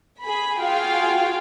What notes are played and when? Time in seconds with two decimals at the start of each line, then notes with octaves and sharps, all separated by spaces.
0.22 G#4 B5
0.60 F4 F#4 G#4 F5 G5